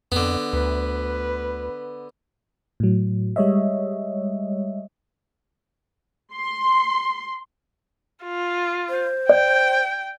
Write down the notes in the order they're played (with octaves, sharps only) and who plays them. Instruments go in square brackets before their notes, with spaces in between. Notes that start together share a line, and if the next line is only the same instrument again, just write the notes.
[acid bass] F2 [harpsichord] D3 B3
[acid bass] D2 [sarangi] B4
[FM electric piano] A2 F#3
G3 G#3 C#5 D#5 E5
[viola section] C6
[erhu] F4
[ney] C5
[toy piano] D5 [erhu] G5